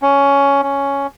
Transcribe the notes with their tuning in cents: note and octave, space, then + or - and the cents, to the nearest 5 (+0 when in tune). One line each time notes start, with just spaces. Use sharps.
C#4 +10
C#4 +5